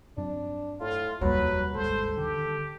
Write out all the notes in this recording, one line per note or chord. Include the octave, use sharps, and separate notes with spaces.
G2 F#3 C4 D4
A2 F4
F1 D#2 F#3 G3 B4
D1 G#1 G#3 A4 C5
D3 D#3 G4